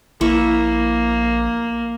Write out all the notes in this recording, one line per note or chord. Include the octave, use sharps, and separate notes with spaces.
A#1 A#3 E4 E5 C#6